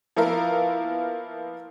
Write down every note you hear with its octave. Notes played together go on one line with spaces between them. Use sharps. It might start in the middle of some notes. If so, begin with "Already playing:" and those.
F3 A#3 B3 E4 F4 A#4